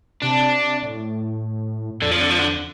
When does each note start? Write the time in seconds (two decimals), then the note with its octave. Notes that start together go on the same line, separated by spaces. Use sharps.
0.22 C3 D4
0.82 A2
2.02 F2 D3
2.11 F3
2.20 D3
2.30 F3
2.39 D3